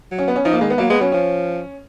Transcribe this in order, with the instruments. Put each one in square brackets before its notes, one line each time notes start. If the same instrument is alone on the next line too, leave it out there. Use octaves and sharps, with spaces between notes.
[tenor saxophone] F#3
[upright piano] C#4
B3
C#4
[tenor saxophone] F3 [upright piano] D#4
[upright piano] A#3
[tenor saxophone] D#3 [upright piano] G#3
[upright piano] B3
[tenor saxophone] F#3 [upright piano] A#3
[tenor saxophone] G#3 [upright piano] B3
[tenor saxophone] F#3 [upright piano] C#4
[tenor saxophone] F3 [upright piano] C#4